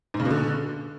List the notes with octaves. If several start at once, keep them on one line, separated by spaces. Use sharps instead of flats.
G#2
C#3
B2
D3